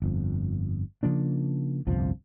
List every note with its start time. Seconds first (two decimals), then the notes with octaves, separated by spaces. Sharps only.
0.02 G1 F2
1.03 C#3 F3 A#3 D4
1.87 G1 C2 F2 F3